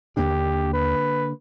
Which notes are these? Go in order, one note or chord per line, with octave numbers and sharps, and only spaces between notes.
D#2 D3 A#3 D4 G4
B4